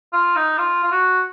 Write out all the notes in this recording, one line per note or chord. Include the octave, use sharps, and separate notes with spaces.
F4
D#4
F4
F4
F#4